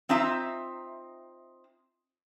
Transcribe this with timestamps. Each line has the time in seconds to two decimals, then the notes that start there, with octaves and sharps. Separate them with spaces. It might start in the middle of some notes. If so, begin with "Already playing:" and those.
0.09 C4 D#4 F4 E5 A#5